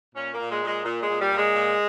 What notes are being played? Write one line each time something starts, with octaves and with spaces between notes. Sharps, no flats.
A#2 C#4
A#3
A#2
G#3
A#2
G#3
A#2
G#3
A#2
G3
A#2
G#3
A#2